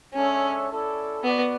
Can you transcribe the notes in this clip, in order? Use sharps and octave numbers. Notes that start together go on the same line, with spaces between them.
G#3 C#4 D4 A4 C#5 E5
C#4 E4 A4 D5
B3 F#4 B4 D5 F#5